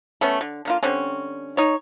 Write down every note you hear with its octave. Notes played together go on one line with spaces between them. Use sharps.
A3 B3 C#4
D3
D3 A#3 F4
D3 G3 C4 C#4
D#4 C#5